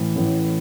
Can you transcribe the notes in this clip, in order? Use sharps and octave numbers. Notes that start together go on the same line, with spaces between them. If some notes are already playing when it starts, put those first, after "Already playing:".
Already playing: A1 A2 E3
A1 A2 E3